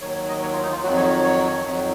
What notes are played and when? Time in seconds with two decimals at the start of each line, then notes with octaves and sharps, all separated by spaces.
0.01 D#2 D#3 F#3 C#5
0.15 C#5
0.28 D#5
0.42 C#5
0.53 F4
0.63 D#4
0.72 F4
0.83 F2 D#3 F#3 F#4
0.97 C#5
1.10 C#5
1.23 C#5
1.65 F2 D#3 F#3